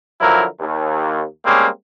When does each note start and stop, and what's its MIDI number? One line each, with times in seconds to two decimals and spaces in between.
0.21 0.46 50
0.21 0.46 53
0.21 0.46 54
0.21 0.46 64
0.21 0.46 70
0.60 1.23 39
1.45 1.67 55
1.45 1.67 56
1.45 1.67 58
1.45 1.67 60
1.45 1.67 61